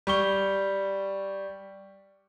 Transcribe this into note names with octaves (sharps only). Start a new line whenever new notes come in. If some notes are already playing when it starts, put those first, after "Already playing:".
G3 C#6 G7